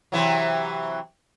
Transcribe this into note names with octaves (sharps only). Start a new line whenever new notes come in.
C3 E3 F#3